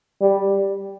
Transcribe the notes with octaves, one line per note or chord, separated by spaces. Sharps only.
G3